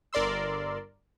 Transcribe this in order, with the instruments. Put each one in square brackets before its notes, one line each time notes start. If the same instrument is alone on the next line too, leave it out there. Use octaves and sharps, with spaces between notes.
[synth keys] G1 A#4 D5 C6 E6